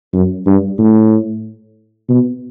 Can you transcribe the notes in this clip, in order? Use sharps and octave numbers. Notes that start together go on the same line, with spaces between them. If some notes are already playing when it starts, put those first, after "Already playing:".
F#2
G2
A2
B2